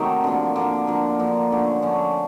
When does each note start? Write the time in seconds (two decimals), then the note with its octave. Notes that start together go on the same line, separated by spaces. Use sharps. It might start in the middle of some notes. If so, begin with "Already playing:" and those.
Already playing: C3 D#3 F#3 A3
0.24 D3 F3 A#3
0.56 D3 F3 A#3
0.87 D3 F3 A#3
1.19 D3 F3 A#3
1.51 D3 F3 A3 C#4
1.82 D3 F3 A3 C#4